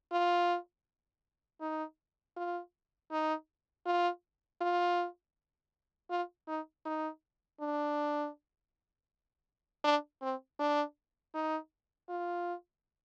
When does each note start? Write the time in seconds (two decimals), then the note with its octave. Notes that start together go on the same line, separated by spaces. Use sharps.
0.12 F4
1.61 D#4
2.36 F4
3.11 D#4
3.86 F4
4.61 F4
6.10 F4
6.48 D#4
6.85 D#4
7.60 D4
9.84 D4
10.22 C4
10.59 D4
11.34 D#4
12.09 F4